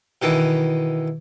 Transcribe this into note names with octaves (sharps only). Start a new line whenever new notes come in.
B2 D#3 E3